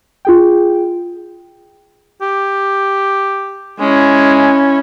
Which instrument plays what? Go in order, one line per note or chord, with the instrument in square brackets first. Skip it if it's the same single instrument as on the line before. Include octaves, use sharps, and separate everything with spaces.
[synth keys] F4 G#4 G5
[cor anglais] G4
[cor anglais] G#3 [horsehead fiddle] C#4 E4